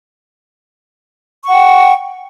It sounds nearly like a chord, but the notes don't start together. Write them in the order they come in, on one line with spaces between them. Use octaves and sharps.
C#6 F#5 G5